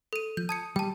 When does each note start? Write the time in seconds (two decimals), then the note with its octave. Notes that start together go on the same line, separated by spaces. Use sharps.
0.13 A4 D#7
0.37 F3 G6
0.49 A5 D#6 G#6 C#7
0.76 G3 G5 A5